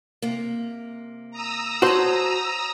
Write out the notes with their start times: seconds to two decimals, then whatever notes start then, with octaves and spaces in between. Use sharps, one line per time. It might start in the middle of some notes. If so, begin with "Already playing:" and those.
0.22 C3 A#3
1.31 A#5 D#6 E6
1.82 F#4 C5 C#5 A5